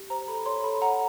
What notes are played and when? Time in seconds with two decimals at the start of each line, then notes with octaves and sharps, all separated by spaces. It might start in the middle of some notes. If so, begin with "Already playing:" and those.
Already playing: G4
0.10 C5 A#5
0.28 A4 B5
0.46 C#5 C6
0.63 A4 B5
0.81 F#5 A#5